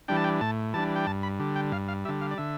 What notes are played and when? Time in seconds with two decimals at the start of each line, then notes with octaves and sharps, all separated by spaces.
0.08 E3 G3 D4 G5
0.16 A5
0.24 G5
0.41 A2 A5
0.73 E3 G3 D4 A5
0.96 G5
1.07 G2 A5
1.23 B5
1.40 D3 G3
1.56 G5
1.72 G2 F5
1.88 F5
2.05 D3 G3 E5
2.21 F5
2.31 D5
2.38 D3 E5